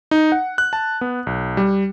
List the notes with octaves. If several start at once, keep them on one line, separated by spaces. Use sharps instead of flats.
D#4
F#5
F#6
A5
B3
B1
G3